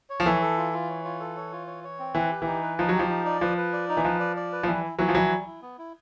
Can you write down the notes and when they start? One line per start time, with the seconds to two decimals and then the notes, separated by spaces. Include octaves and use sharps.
0.10 C#5
0.20 F3
0.26 E3 A4
0.42 A4
0.58 F4
0.73 F4
0.90 C#5
1.04 F4
1.20 A4
1.37 C#5
1.52 F4
1.67 C#5
1.84 C#5
1.99 C4
2.15 E3 B4
2.31 G4
2.42 E3 D#4
2.63 B4
2.79 F3 D#4
2.89 F#3
2.95 F3 G4
3.09 D#4
3.25 D5
3.41 F3 B4
3.57 B4
3.73 D5
3.89 D#4
3.97 E3
4.04 F3 B4
4.20 D5
4.36 D5
4.52 B4
4.63 F3
4.67 E3 G3
4.84 E4
4.99 E3 F#3 E4
5.08 F3
5.15 E3 F#3 G3
5.30 G3
5.46 E4
5.62 B3
5.78 E4